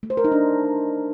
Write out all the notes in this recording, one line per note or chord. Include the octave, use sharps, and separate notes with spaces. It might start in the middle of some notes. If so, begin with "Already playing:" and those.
A3
C5
A#4
D#4
D4